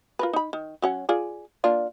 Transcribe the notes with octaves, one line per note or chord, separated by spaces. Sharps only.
F4 A#4 B4
D#4 B5
D#3
F#3 C#4 F#5
F4 G#4 D5
A#3 D4 F4